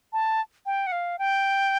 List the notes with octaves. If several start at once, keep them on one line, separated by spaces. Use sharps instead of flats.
A5
G5
F#5
F5
G5